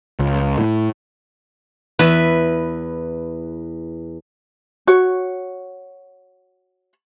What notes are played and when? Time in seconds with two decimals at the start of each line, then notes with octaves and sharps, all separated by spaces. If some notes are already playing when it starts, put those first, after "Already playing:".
0.19 C#2
0.58 A2
1.99 E2 B4 E5
4.87 F#4 C#5